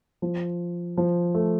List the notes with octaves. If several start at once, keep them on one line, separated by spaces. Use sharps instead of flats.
F3
F3
A3